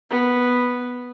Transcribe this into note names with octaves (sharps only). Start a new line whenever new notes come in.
B3